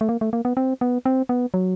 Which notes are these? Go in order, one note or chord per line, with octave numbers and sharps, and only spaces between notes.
A3
A#3
A3
A#3
B3
C4
B3
C4
B3
F#3